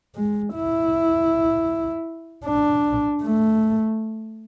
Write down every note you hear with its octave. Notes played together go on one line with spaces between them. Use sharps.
G#3
E4
D4
A3